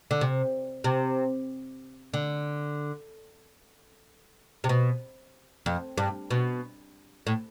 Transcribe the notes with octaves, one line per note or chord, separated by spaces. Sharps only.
D3
C3
C3
D3
C3
B2
F2
G2
B2
A2